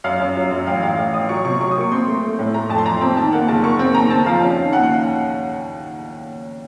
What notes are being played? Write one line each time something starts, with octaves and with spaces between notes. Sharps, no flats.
F#2 F5
F#2
F#3
F#2
A1 F5
A1 F5
A1
A1 D#6
F#3 C#6
C3 C#6
F#3 C#6
D#6
A#3 C#6
C4 C6
A3
A3
A2
A3 A#5
F2 A5
C6
F2 A#5
C4 A#5
D#3 A5
A#3 F#5
F#1 A5
A#3 C#6
C4
D#2 A#5
C4 A5
F3 F5
C#4
D#3
D#2 F#5
F#5